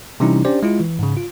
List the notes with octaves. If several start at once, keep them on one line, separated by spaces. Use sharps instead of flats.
C3 E3 G3 C#4 D#4 E4
C#4 D4 G4 C5 D5
G#3 E4 F4
E3
G#2 C#3
F4